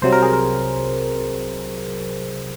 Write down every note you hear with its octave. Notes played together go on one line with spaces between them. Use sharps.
C2 C3 F#3 C5
A#4
G#4
A#4